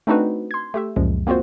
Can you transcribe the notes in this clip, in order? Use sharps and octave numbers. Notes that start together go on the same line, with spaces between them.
A3 C4 D4 D#4 F#4 B4
C6 G#6
A3 G4 E5
C#2 F#2 A#2 F3 G#3
A#3 C4 F4 F#4 C5